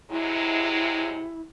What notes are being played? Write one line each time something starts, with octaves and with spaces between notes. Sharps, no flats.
C3 F#3 G#3 E4